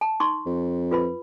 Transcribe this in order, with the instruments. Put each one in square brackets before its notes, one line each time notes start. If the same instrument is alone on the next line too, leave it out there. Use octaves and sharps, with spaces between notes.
[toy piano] A5
D#4 C6 C#6
[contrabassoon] F2
[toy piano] F4 B4 B5